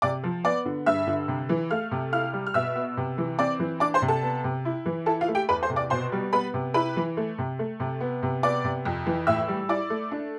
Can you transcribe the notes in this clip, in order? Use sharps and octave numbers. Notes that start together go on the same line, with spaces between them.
C3 D5 D6
F3
B3 D5 D6
D3
G2 E5 E6
D3
C3
E3
A3 F5 F6
C3
E4 F5 F6
G3
F6
B2 E5 E6
B3
C3
E3
C4 D5 D6
E3
D4 D5 D6
C5 C6
C3
A4 A5
B3
C3
E4
E3
E4 A4 A5
F4 F5
A3
G4 G5
E2 B4 B5
C5 C6
C3
D5 D6
B2 C5 C6
G3
B3 B4 B5
C3
E4 B4 B5
E3
A3
C3
A3
C3
B3
C3
B3 D5 D6
C3
F2
E3
A2 E5 E6
G3
E4 D5 D6
A3
D4